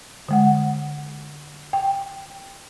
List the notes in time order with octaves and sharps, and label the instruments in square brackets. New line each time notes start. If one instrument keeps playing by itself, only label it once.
[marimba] D3 G#3 F#5
G5